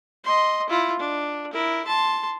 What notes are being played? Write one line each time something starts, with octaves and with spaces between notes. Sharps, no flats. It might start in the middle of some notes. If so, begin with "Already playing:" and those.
D#5 C6
E4 F4
D4
E4 A#4
A5 C6